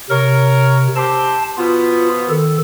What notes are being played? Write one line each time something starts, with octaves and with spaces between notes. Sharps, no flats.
C3 A#4 C#5
C4 G4 A5
B2 F3 B3 F4
D#3 A4